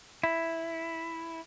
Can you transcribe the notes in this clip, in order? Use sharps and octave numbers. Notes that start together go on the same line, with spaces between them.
E4